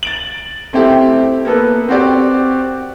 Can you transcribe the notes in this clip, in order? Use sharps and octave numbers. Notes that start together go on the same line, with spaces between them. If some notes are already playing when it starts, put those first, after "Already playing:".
A6 D7 F#7
A3 C4 E4 G4
A#3 B3 A4 B4
C4 F#4 G4 D5